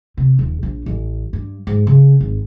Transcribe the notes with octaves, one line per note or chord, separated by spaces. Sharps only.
C3
D#1
A#1
A1
G2
G#2
C#3
G#1